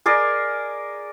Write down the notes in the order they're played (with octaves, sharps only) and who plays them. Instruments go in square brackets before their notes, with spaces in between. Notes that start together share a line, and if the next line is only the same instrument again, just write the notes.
[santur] G#4 A#4 D5 D#5